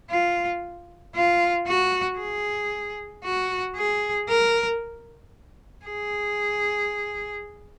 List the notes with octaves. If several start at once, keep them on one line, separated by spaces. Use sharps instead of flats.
F4
F4
F#4
G#4
F#4
G#4
A#4
G#4